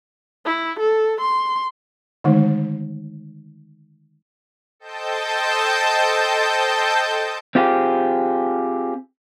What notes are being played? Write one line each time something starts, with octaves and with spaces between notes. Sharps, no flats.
E4
A4
C6
D3 D#3 G#3 A3 D#4
A4 C5 D#5 G5 A5 G6
C4 F4 G4 G#4